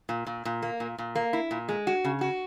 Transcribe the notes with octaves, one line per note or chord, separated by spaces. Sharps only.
A#2
A#2
A#2
A#3
A#2
A#2
A#3
E4
A#2
G#3
F#4
C#3
F#4